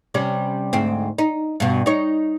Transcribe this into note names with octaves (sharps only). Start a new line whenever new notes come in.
C3 G3 C#4
D2 G#2 C4
D#4
G2 B2
D#4 C#5